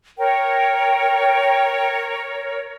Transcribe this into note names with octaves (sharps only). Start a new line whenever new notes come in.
A#4 C#5 G5